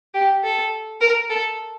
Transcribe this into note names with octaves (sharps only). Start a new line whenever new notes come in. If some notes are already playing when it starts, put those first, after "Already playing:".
G4
A4
A#4
A4